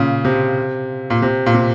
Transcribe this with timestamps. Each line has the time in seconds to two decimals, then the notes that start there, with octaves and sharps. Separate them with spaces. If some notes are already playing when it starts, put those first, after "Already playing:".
Already playing: A#2 C#3
0.25 C3
1.10 A#2
1.22 C3
1.46 A#2
1.54 C3